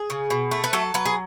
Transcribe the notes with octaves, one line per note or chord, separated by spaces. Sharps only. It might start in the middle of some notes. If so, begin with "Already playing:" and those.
Already playing: G#4
C#3
B2
A3
B4
F#3 A4
F#3 B4
G#4